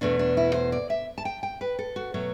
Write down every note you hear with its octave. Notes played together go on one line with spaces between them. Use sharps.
E2 B2 A3 D4
D4
E4
C5
D5
E5
A5
G5
G5
B4
A4
F#4
B2 F#3 A3